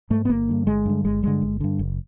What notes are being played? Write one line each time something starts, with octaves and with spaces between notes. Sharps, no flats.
G#2 A3
B3
G1 A#3
G2 D3
G1 G#3
G2 D3
G1 G#3
G2 D3 G#3
G1
G2 D3
F#1